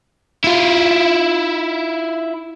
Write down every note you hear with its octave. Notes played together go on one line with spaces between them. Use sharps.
E4 F4